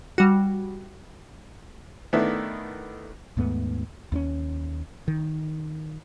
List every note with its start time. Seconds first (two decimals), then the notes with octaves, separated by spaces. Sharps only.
0.18 G3 F#4
2.13 D#3 A3 B3 D4 E4
3.37 D#2 G#2 A3 B3
4.12 D#2 B3 C#4
5.08 D#3